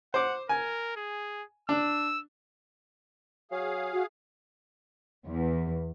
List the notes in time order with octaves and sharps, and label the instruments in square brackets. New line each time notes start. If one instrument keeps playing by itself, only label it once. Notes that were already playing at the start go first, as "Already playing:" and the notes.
[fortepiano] C5 D6 [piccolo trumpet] F#5
[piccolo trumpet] A#4 [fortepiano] G#5
[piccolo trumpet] G#4
[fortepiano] D4 [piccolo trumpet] E6
[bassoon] F#3 [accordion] G#4 F5
[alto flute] F#4
[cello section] E2